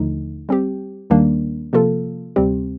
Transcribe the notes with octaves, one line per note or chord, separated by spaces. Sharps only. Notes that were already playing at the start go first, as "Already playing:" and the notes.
Already playing: D#2 D3 F3 A3 D#4
G3 C4 G4
D#2 D#3 G3 A#3 D4
C3 F3 A#3 F4 A4
D2 C3 G3 C4 G4